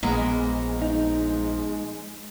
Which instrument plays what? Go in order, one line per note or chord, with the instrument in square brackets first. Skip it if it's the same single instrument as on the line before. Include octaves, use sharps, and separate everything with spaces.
[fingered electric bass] A#1 [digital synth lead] G#3 [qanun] A#3 B3 A#4
[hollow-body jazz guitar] D#4